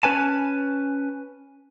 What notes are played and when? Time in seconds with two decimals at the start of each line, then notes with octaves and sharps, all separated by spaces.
0.03 C#4 B4 G#5 A5